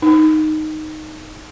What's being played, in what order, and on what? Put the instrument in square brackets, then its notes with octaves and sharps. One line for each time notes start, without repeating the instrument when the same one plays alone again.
[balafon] D#4